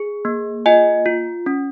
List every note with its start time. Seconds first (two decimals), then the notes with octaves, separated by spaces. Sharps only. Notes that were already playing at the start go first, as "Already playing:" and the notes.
Already playing: G#4
0.25 A#3
0.66 F4 D#5 G#5
1.06 F4
1.46 C#4